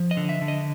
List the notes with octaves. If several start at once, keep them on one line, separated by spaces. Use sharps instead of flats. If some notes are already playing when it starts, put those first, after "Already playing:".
Already playing: F3
D#5
D3
E5
D3
D#5